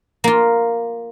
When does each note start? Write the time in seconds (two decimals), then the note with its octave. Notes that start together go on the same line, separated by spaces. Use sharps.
0.24 A#3 F4